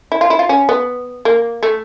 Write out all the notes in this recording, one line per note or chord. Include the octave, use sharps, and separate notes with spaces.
E4
F4
E4
F4
C#4
B3
A#3
A3